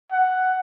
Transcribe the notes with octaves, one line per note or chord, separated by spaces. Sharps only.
F#5